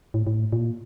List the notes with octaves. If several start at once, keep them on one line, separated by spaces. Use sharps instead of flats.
A2
A2
A#2